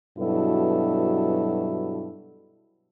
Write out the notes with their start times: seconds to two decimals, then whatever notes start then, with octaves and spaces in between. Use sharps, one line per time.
0.18 G2 B2 F#3 E4 A4